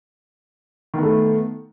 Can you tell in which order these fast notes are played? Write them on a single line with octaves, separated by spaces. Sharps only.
D#3 B3 A3